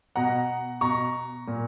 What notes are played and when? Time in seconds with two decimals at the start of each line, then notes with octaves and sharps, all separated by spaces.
0.16 B2 F#5 A#5
0.81 B2 A#5 C#6
1.48 A#2